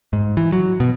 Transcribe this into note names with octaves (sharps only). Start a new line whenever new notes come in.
G#2
E3
F#3
B2